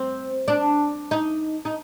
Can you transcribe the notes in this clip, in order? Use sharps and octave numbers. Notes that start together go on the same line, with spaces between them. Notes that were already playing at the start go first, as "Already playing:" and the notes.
Already playing: C4
D4
D#4
D#4